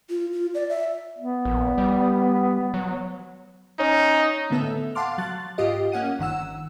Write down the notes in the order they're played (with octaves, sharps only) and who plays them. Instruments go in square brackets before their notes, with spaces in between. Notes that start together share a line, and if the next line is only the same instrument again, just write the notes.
[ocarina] F4
F4
D5
E5
[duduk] B3
[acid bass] A#1
G3
F#3
[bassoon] C#4 [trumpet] D#4
[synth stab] A2 D3 B3 A4 E5
F5 F#5 A5 C6 D6 F6
F#3 F#6 A6
G#2 F4 G4 D#5
A#3 C#4 F#5 D#7
G1 D#3 F#5 E6